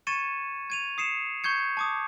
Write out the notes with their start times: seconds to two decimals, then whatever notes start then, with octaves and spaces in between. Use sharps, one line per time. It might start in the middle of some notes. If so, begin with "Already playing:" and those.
0.07 C#6 G#6 A6 C#7 D#7 E7
0.70 G#6 D#7 F7
0.98 D#6 C7 C#7 E7
1.44 C#6 G6 G#6 C#7
1.77 A5 D6 D#6